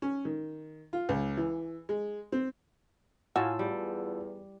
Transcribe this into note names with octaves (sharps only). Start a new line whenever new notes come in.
C#4
D#3
F4
C#2
E3
G#3
C4
A2 F4 F#4 F5 G#5 A5 E6
E2 G3